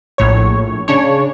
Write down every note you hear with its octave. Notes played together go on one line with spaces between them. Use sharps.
A#1 A2 C#5
C#3 D4 C#5